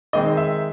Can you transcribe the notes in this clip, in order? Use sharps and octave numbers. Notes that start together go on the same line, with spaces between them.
D#3 G#3 C4 D#5
E5